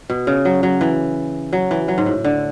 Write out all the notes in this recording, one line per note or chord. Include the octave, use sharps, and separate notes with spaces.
B2
C#3
F#3
F#3
E3
F#3
E3
F#3
G#2
A2
D3